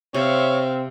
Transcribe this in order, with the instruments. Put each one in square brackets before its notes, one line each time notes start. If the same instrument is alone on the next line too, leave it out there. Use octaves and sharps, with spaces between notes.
[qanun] C3 [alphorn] C4 [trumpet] C#5 [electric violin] E5 F5